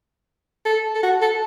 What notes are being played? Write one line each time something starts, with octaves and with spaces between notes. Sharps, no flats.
A4
A4
F#4
A4